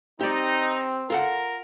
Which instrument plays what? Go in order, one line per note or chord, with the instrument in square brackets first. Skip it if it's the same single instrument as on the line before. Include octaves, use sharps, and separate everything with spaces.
[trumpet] C4 [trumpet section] D#4 [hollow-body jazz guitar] G4 D5
[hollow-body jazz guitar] F4 A4 F#5 [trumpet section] A#4